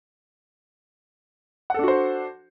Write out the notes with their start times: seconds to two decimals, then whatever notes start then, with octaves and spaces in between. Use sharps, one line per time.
1.70 F#5
1.74 A4
1.79 D4
1.83 F#4
1.88 C5